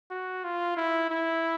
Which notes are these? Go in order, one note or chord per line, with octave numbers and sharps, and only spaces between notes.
F#4
F4
E4
E4